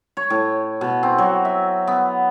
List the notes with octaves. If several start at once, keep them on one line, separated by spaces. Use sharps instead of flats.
C#5
A2
B2
C4
F#3
E5
B3